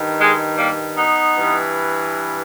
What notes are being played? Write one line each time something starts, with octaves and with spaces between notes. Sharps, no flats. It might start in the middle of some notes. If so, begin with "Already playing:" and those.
Already playing: G2 D#3
G#3
G3 A#3
B3 D#4
G2 E3